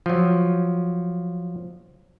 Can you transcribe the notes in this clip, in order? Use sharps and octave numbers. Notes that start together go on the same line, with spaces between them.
F3 F#3